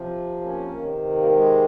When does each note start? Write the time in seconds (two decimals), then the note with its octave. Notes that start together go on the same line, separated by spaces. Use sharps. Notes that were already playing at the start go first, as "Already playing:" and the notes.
Already playing: C3 F3
0.41 A#3 C#4
0.71 C3 D#3
1.17 G3 A#3
1.32 G#3